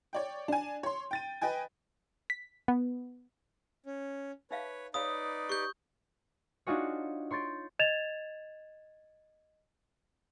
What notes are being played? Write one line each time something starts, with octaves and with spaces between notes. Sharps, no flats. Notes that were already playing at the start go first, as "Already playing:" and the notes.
C#5 D5 G5
D4 G#5
C#5 C6
G5 A6 D#7
B4 D#5 G5 G#5
B6
B3
C#4
D#4 B4 C#5 E5 F5
D#4 B4 C#5 D5 F5 B5 D#6
G4 C#6 G6
D4 D#4 F4 F#4 G#4 C#5
C#5 C6 G6 A6 D7
D#5 G#6 A6 E7 F7